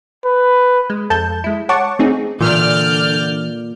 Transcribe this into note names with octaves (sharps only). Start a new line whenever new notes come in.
B4
G#3
F2 A4 A5 G6
G#3 E4
C#5 F#5 A5 C#6 D6
A3 C4 D#4 G#4
A#2 D3 E3 D5 F6 G6